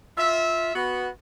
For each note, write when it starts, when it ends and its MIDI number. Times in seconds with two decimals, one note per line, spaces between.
0.18 0.75 65
0.18 0.75 76
0.75 1.08 59
0.75 1.08 66